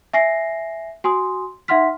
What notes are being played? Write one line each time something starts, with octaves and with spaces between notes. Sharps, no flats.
E5 G#5 A#6 C7
F#4 G#5 C6 D#6
D#4 E5 F#5 C6 F6 B6